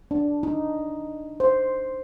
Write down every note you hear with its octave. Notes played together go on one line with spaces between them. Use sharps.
D4
D#4
C5